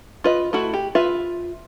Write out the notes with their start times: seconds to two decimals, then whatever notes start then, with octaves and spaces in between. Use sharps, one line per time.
0.24 F4 B4 D#5
0.53 A3 E4 F#4
0.74 G4
0.95 F4 B4 E5